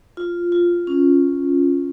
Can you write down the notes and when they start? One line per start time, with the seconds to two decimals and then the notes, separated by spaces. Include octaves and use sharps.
0.17 F4
0.52 F4
0.87 C#4